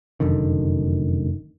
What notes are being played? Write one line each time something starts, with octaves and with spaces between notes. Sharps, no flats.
F1 F#2 D3 D#3